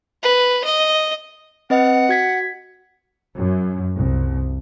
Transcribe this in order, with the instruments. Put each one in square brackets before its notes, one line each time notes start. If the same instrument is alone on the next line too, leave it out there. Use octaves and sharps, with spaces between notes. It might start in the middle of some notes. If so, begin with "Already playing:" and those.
[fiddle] B4
D#5
[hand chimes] C4 B4 D#5 [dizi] F#5
[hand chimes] F#4 G#6 B6
[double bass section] F#2
C2